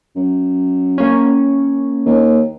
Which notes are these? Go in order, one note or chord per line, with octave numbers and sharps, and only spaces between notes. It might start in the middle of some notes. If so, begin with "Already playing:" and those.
F#2
A#3 C#4
D#2